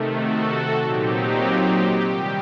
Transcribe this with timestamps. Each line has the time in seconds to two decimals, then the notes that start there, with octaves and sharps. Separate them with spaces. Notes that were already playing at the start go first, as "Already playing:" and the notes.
Already playing: C3 D#3 A3
0.16 F#4 A4
0.80 A#2 F#3 C4 D#4 G4
2.07 C3 D#3 G3